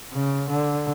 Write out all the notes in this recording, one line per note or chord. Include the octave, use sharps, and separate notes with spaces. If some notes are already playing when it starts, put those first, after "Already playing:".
C#3
D3